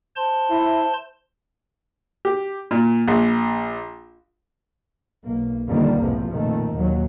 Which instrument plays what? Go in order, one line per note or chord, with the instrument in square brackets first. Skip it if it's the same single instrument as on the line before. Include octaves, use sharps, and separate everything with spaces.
[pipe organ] C5 A5 C6
[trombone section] E4
[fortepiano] G4
A#2
A#1
[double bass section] B1 A#3
F2 B2 D3 D#3 G3 A#3
B1 E2 G#2 C3 F3
F2 A#2 D#3 A3
D#2 A#2 F#3